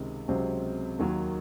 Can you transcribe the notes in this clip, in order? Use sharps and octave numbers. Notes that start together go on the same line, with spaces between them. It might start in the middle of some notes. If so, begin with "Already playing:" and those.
Already playing: C#2 C3 D#3
C#2 C3 F#3 C4
D#2 D#3 F#3